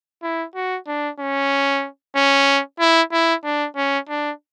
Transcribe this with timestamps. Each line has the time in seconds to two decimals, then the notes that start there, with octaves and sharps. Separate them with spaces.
0.23 E4
0.55 F#4
0.87 D4
1.20 C#4
2.16 C#4
2.80 E4
3.12 E4
3.44 D4
3.76 C#4
4.09 D4